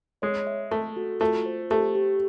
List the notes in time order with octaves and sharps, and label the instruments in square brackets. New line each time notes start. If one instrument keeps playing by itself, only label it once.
[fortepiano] G#3 [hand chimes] C#5
[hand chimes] E5
[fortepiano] A3 [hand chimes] A4
[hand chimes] F#4
[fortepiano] A3 [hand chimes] F4
[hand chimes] C5
[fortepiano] A3 [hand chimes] G4
[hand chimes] G4